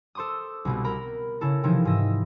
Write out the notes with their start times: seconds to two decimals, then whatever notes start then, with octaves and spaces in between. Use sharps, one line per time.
0.15 A4 C5 C6 D6 D#6
0.65 C2 B2 B3
0.84 A#4 A#5 B5
1.41 C#3 E4 A4 A#4
1.63 C3 E3 F3 D#4 E4
1.85 G#2 D#5 E5